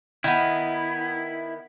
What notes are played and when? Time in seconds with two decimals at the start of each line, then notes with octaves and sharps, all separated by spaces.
0.24 D#3 B3 E4